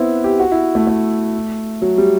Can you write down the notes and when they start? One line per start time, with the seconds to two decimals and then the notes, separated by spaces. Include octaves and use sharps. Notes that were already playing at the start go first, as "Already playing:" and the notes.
Already playing: B3 C4 E4
0.24 G4
0.39 F#4
0.52 E4
0.75 A3
0.87 A3
1.82 F#3
1.98 G3